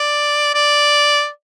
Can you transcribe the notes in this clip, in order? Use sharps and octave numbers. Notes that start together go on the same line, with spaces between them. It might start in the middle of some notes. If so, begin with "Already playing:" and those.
Already playing: D5
D5